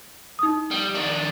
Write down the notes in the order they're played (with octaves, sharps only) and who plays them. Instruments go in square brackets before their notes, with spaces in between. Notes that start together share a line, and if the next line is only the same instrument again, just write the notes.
[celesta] D#4 D#6
[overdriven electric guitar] G3
D#3 D4